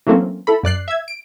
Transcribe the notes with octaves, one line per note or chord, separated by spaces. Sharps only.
E3 F#3 A3 A#3 C4 C#4
E4 A4 B5
F#2 D5 F#6 C7
E5 G#6
D7